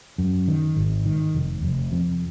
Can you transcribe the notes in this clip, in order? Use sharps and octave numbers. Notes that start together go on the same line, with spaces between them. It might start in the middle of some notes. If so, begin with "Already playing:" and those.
F#2
D#3
G#1
D#3
F1
F1
F2